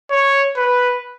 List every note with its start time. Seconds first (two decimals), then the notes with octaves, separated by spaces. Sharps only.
0.11 C#5
0.57 B4